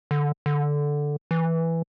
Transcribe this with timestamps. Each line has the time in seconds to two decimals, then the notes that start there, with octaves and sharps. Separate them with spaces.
0.11 D3
0.46 D3
1.31 E3